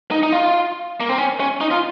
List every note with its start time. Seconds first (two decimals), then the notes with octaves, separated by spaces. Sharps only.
0.11 D#4
0.23 D#4
0.32 F4
1.00 A#3
1.09 C4
1.18 C#4
1.40 C#4
1.61 D#4
1.71 F4